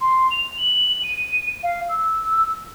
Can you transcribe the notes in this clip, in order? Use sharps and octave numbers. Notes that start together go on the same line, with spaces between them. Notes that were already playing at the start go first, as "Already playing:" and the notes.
C6
F7
F#7
D#7
F5
E6